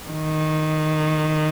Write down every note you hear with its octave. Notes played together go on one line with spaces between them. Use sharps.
D#3